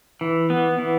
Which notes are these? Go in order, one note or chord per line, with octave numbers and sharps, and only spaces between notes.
E3
B3
E3